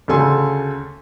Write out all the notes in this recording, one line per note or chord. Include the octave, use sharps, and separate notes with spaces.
D2 C#3 A4 G#5 C6